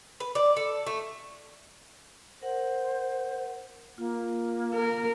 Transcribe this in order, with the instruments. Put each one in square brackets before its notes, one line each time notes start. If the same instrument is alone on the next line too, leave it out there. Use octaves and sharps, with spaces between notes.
[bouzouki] B4
D5
A4
A3
[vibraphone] A#4 F#5 [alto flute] C5
[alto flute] A#3 [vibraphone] F4
[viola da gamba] A#4